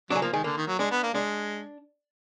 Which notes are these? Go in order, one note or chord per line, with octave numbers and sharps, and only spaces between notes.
F#3 D4
G#3
F3 A#3
D#3 G#3
D3 A#3
D#3
F#3
G#3 D4
B3
A#3
G#3 D4